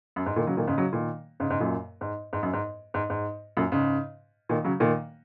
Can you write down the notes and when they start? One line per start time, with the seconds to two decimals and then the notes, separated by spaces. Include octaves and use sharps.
0.16 F#2
0.26 G#2
0.36 A#2 D#3
0.47 C#3 F#3
0.57 A#2 D#3
0.67 G#2 C#3
0.77 C#3 F#3
0.93 A#2 D#3
1.40 G#2 C#3
1.50 G#2 C#3
1.60 F#2 A#2
2.01 G#2
2.33 G#2
2.43 F#2
2.53 G#2
2.94 G#2
3.10 G#2
3.57 F#2 A#2
3.72 G#2 C#3
4.49 A#2 D#3
4.65 C#3 F#3
4.80 A#2 D#3